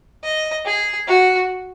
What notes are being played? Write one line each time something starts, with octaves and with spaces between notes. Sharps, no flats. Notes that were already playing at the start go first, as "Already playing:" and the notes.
D#5
G#4
F#4